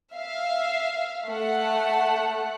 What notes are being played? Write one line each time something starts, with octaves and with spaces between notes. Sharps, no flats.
E5 F5
A3 F#5